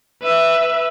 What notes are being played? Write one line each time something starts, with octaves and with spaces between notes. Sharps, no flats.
B4 E5